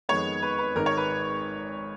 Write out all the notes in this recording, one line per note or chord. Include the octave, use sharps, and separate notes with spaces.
F2 D#3 G#3 B3 C#5
B4
B4
G#1 G#2 D#3 A#4
C#5
B4